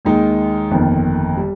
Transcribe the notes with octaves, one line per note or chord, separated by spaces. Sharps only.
D#2 D#3 G#3 D#4
G1 F2 D#3 A#3
G3